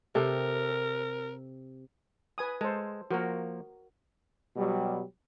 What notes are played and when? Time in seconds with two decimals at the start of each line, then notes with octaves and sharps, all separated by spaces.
0.15 C3 A4 A#4 G5
2.38 B4 G#5 D#6
2.61 G#3 A4 C5
3.11 F3 A#3 F#4 A#4
4.56 B2 F#3 G3